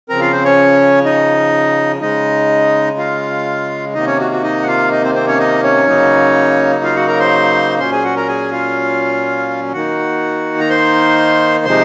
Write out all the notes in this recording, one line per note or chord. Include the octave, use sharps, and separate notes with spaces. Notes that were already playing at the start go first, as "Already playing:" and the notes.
C#3 F3 C4 A#4 A#5
F4 F5
C4 C5
C#4 C#5
D#4 D#5
C#3 G#3 D#4 D#5
F4 F5
C3 D#3 A#3 D#4 D#5
C#4 C#5
F#4
F#4
D#4 D#5
F#5
F4 F5
D#4 D#5
C4 C5
C4 C5
C#4 C#5
D#4 D#5
C#4 C#5
C#3 F#3 A#3 D#4
F4 F5
F#4 F#5
A#4 A#5
C5 C6
A#2 F#3 C#4 C5 C6
G#4 G#5
F#4 F#5
A#4 A#5
G#4 G#5
F4 F5
D#3 A#3 D#4 F#4 F#5
A#5
C5 C6
C3 F3 G#3 D#4 C5 C6